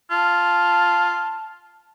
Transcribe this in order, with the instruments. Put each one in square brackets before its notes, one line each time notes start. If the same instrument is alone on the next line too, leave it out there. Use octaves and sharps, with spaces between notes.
[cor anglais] F4 [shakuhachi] A5